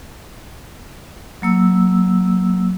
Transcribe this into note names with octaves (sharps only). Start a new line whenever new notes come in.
F#3 A#3 E6